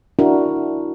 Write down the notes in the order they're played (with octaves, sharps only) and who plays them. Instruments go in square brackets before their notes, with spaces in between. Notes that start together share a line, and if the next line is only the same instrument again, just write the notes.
[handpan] D4 E4 F#4 A#4